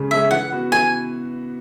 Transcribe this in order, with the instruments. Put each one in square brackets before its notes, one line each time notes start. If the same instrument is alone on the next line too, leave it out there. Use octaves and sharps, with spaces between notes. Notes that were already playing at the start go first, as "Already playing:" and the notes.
Already playing: [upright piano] C#3 G#3 C#4 G#4
[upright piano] G#3 C#4 G#4 [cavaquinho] E5
[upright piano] E3 [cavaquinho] F#5
[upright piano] B3 F#4
[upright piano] E3 [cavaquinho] G#5